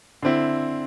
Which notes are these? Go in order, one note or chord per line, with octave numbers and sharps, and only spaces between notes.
D3 C4 E4